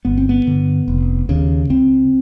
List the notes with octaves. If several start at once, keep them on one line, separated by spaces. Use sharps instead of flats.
G1 B3
C4
B3
G2 D3
F1
D#2 C#3
C#2 C4